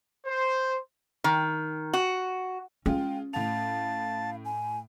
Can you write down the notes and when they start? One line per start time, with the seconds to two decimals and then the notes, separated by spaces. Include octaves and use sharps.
0.27 C5
1.24 D#3
1.93 F#4
2.86 G#3 C#4 F4 G5
3.33 A2 F5 A5 F7
4.45 G#5